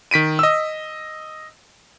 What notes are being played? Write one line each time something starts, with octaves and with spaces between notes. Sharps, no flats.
D#3 B6 D7 D#7
D#5 E6